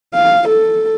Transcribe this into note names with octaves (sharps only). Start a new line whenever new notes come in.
F5
A4